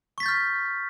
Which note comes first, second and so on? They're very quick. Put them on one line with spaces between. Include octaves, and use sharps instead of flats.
C#6 B6 A6 G6 F6